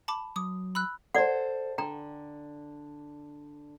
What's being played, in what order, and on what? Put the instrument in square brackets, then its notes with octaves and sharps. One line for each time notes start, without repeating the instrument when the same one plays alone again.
[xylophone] A5 B5 D6
[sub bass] F#3 [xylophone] D6 D#6
[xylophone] B5 E6 F#6
[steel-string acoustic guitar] A4 C5 [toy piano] D5 F#5
[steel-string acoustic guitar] D3 [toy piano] G5 A#5